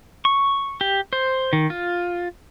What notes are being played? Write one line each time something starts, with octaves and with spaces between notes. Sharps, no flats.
C#6
G4
C5
D#3
F4